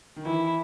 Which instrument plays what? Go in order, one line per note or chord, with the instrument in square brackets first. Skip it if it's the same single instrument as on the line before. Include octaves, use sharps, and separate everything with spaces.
[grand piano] D#3
[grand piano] E3 [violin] E4